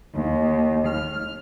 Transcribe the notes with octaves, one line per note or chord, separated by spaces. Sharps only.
D#2
F6